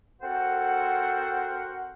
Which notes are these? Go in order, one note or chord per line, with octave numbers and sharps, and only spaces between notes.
C4 F#4 A4 A#4 C5 F#5